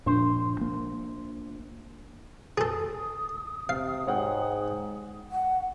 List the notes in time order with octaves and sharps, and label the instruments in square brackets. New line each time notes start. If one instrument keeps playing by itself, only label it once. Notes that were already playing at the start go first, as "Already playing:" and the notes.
[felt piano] A#1 [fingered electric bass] A#2 [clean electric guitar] C5
[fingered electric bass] A#3
[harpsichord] G#4 A4 [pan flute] D#6
[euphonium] C3 [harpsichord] F5
[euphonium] G#2 [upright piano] C#5 F#5 G5
[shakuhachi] F#5